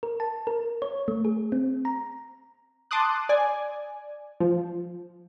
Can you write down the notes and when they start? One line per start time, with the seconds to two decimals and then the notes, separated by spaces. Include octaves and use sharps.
0.03 A#4
0.20 A5
0.47 A#4
0.82 C#5
1.08 A3
1.25 G#4
1.52 C4
1.85 A#5
2.91 A5 C6 D6 D#6 F#6
3.29 D5 G#5
4.40 F3